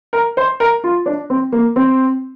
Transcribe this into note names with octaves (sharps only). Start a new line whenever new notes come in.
A#4
C5
A#4
F4
D4
C4
A#3
C4